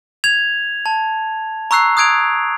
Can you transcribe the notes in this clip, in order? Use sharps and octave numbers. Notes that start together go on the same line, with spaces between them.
G#6 F7
A5
A#5 C#6 E6 F#6 C7
D#6 F#6 G#6 D7 F7